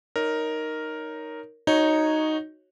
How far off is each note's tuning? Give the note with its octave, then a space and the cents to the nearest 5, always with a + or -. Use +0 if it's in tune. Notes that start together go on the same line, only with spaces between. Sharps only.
D#4 +0 A#4 +0 C#5 +15
D#4 +0 F#4 +0 C#5 -10